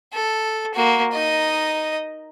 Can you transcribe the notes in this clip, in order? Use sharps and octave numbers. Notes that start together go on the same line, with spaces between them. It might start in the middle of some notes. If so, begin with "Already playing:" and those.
A4
A#3 F#4
D#4 D#5